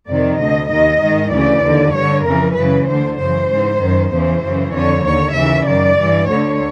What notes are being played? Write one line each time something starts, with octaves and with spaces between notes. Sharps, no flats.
F2 C3 D#3 D5
D2 D3 D#5
D#2 D#3 D#5
G#2 D#3
D2 C#3 E3 D5
D#2 D3
G2 D3 C#5
F2 C#3 E3 A#4
F#2 C#3 E3 B4
D2 D3 C5
F#2 C#3 E3 C5
G#2 E3
F#2 D#3
E2 C#3 E3 C5
F#2 C#3 E3
F2 D3 C#5
D#2 D3 C#5
D#2 C#3 E3 E5
F#2 D#3 D5
G2 E3
D2 D3 C#5